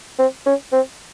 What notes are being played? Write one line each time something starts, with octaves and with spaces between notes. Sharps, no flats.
C4
C#4
C4